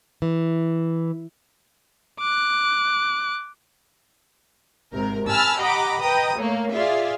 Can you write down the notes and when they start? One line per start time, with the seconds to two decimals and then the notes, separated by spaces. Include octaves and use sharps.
0.22 E3
2.20 D6 F#6
4.93 G#1 C3 A#4
5.28 G#5 A5 B5 E6 F6
5.59 G4 D#5 F#5 A#5 B5 D6
6.00 B4 D#5 G5 A#5 D#6
6.37 A3 A#3 C#5
6.74 F4 G#4 D5 E5 F5